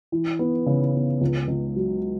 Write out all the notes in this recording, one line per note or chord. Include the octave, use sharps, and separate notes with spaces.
E3
B3
C#3
B3
C#2
C#2
F#3